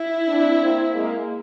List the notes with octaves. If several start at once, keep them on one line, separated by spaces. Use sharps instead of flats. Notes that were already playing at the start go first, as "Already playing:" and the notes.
Already playing: E4
C4 D4
A#3 C4
G#3 A#3